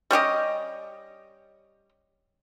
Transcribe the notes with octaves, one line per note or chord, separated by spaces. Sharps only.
G3 C#4 G4 D#5